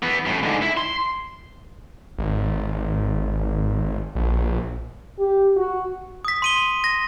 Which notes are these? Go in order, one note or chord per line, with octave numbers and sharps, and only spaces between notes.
E3 B3
F#2 A2
G#2 D3
E4
C6
G#1
A#1
G4
F#4
D#6 B6
C6 D#7 G7
A#6